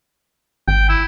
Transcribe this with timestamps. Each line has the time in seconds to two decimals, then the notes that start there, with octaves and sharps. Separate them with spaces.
0.68 G#1 G5
0.89 E4